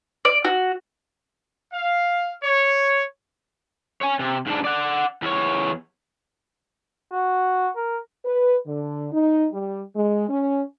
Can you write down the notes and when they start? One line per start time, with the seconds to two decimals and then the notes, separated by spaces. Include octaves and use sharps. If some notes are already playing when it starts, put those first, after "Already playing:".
0.25 D5
0.44 F#4
1.73 F5
2.43 C#5
4.01 C#5 G#5
4.19 C3
4.46 G#2 D4
4.64 D5 F#5
5.22 E2 C#5
7.12 F#4
7.76 A#4
8.25 B4
8.67 D3
9.13 D#4
9.53 G3
9.95 G#3
10.29 C#4